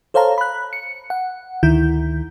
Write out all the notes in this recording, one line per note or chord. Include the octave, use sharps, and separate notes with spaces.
A4 C5 C#5 F5 A5 A#5
B5 F#6
C#7
F#5
D2 D#3 E4 G6